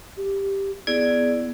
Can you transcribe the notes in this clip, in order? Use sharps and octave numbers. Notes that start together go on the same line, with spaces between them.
G4
B3 E4 G#4 D5